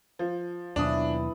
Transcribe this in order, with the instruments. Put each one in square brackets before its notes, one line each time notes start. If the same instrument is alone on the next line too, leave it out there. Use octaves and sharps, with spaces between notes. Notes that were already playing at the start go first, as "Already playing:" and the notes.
[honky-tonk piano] F3
[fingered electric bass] D#2 B2 F#3 [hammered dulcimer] E3 E4 B5 [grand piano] D4 D#6